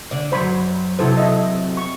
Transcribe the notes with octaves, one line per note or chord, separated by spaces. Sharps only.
D3 D5
F#2 F#3 C5 B5 C#6
C3 F#3 E4 A4 C5
D#5 E5
C#6